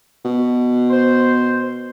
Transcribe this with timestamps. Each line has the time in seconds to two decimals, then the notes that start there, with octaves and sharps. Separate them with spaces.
0.25 B2
0.91 C5